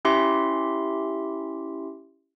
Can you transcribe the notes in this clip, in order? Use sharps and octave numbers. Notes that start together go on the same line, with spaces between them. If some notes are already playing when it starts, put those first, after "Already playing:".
C#4 E4 G4 E5 C6